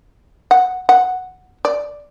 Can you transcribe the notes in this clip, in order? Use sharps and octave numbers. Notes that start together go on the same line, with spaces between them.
F#5
F#5
D5